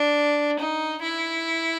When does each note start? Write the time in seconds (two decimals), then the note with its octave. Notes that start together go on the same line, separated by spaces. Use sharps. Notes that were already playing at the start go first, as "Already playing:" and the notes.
Already playing: D4
0.59 D#4
1.02 E4